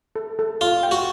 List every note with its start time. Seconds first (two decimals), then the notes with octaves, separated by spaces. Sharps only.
0.16 A4
0.39 A4
0.61 F4 D5
0.83 G5
0.91 F#4